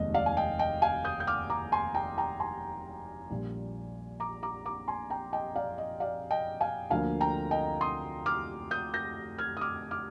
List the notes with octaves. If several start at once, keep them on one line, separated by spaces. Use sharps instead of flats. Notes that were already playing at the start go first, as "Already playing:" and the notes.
Already playing: F1 D#2 D#3 G#3 D#5
D5 F5
G#5
D#5 G5
D#5 G5
F5 G#5
D#6 G6
G6
D6 F6
A#5 D6
G#5 C6
G5 A#5
G5 A#5
G#5 C6
A#1 A#2 G3
A#5 D6
A#5 D6
A#5 D6
G#5 C6
G5 A#5
D#5 G5
D5 F5
D#5
D5 F5
D#5 G5
F5 G#5
D2 D3 F3 A#3 F5 G#5
G5 A#5
D#5 G5
C6 D#6
D6 F6
D#6 G6
G6 A#6
F6 G#6
D#6
D6 F6
D6 F6